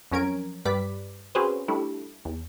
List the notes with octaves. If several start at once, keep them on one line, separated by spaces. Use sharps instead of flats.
F2 F#3 C#4 A#4 G#6 D7
G2 G3 B4 D5 D6 B6
C4 C#4 F#4 G#4 B4 C5
G3 A3 D4 E4
E2